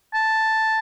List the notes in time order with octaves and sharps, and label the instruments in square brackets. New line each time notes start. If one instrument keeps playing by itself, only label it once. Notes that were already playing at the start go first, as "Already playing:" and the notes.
[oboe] A5